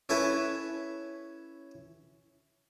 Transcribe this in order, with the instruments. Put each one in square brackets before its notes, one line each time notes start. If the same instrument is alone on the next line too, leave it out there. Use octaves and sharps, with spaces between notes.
[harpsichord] C#4 E4 A4 B4